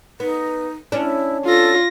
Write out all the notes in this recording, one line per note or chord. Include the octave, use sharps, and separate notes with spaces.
B3 D#4
C#4 D4 E4
F4 A4 A#6